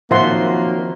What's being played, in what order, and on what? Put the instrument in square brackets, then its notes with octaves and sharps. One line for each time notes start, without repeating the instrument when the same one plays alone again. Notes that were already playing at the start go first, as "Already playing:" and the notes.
[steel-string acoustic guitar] D#3 F#3 [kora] F3 C4 [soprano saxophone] A#3 [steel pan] E5 F#5 C6